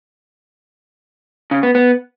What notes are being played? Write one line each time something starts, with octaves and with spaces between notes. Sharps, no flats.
C#3
B3
B3